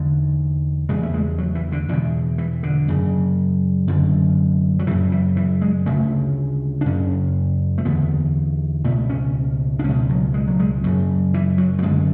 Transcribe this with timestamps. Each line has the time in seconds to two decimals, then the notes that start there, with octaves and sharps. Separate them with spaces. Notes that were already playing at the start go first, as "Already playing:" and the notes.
Already playing: E2 D3
0.89 E2 C#3 G#3
1.03 A3
1.14 G#3
1.38 F#3
1.55 E3
1.72 D3
1.89 E2 D3
1.93 B2
2.38 E3
2.63 D3
2.88 F#2 C#3
3.87 F#2 D3
4.79 F#3
4.87 F#2 C#3 E3
5.12 E3
5.37 E3
5.61 G#3
5.86 D2 C#3 A3
6.81 D4
6.86 F#2 C#3 C#4
7.78 A3
7.85 E2 D3 B3
8.84 B2 A3
8.89 C#2
9.09 C#4
9.79 D4
9.84 C#2 C#4
9.89 B2
10.09 F#3
10.34 G#3
10.47 F#3
10.59 G#3
10.84 F#2 C#3 F#3
11.34 E3
11.58 F#3
11.79 F#3
11.83 F#2 D3 G#3